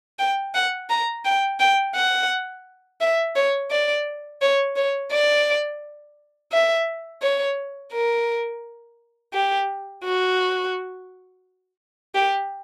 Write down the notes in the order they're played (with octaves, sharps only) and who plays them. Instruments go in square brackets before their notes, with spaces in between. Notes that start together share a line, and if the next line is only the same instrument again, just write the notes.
[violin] G5
F#5
A#5
G5
G5
F#5
E5
C#5
D5
C#5
C#5
D5
E5
C#5
A#4
G4
F#4
G4